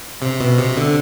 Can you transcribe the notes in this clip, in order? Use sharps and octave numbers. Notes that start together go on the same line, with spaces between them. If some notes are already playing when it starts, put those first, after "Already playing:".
C3
B2
C3
D3